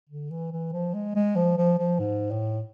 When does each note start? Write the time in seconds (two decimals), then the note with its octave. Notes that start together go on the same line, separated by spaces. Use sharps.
0.09 D3
0.30 E3
0.52 E3
0.72 F3
0.94 G#3
1.15 G#3
1.36 F3
1.57 F3
1.79 F3
1.99 G#2
2.31 A2